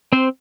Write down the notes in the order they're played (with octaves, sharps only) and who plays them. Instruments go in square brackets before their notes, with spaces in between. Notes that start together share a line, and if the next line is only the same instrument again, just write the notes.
[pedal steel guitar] C4 C5